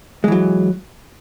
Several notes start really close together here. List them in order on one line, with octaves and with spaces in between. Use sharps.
G#3 E3 F#3